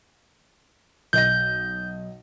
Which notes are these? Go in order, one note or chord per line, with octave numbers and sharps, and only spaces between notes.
B1 D#5 G6 A#6